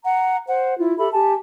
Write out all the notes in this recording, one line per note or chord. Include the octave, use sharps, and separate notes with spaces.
F#5 A#5
C5 F#5
E4 F4
G4 A4 E5 B5
G4 G#5 A5